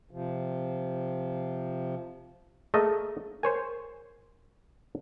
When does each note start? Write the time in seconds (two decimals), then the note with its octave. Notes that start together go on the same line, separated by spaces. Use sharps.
0.11 C3 F3
2.74 A3 A#3 G#4 D#5
3.43 A#4 C5 C#5 G#5